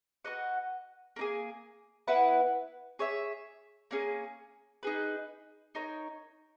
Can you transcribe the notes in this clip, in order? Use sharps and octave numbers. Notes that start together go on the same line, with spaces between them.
F#4 B4 D#5 F#5
A#3 D#4 G#4
B3 E4 B4 F#5
G#4 C#5 E5
A#3 C#4 G#4
D#4 G#4 B4
D#4 A#4 C#5